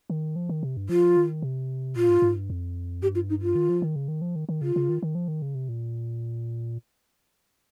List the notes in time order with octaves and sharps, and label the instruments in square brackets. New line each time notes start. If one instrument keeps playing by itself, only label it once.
[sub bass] D#3
F3
D#3
C3
G2
[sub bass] F3 [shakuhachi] F4
[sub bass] D#3
C3
[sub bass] A#2 [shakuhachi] F4
[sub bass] G#2
G#2
G2
F2
[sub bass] G2 [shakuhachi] G4
[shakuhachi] F4
D#4
F4
[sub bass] D#3
F3
D#3
C#3
D#3
F3
D#3
D#3
[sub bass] C#3 [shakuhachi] F4
[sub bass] C#3
D#3
D#3
F3
D#3
C#3
C3
A#2